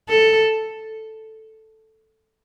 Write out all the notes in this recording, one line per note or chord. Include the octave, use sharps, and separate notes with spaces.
A4